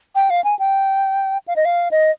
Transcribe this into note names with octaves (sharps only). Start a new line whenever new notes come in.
G5
F5
G#5
G5
F5
D#5
F5
D#5